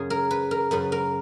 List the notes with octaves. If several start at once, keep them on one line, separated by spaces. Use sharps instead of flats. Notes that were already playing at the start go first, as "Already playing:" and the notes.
Already playing: F#2 C#3 G#4
A#4
B4
A#4
F#2 C#3 B4
A#4